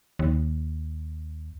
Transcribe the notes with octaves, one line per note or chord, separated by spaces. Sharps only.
D#2